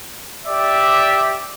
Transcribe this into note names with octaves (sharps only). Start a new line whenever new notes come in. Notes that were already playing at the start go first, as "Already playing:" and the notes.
G4 D5 E5